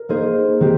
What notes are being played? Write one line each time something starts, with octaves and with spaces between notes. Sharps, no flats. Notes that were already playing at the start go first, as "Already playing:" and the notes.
Already playing: A#4
A#3 D#4 G#4 C5
D#3 G#3 C4 G4